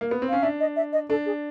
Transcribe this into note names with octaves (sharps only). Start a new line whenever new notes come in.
A#3
B3
C4
C#4 F5
D4 E5
D#5
E5
D#5
D4 A4
G#4